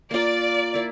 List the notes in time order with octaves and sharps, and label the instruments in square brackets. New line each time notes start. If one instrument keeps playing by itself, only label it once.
[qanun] A#3 F4 A#4 [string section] D5
[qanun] A#3 E4